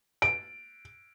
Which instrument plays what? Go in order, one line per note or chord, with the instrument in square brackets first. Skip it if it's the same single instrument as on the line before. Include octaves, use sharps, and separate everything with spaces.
[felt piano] D7